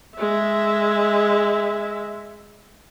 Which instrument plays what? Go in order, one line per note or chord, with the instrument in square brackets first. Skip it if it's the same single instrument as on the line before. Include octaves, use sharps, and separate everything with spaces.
[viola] G#3 E5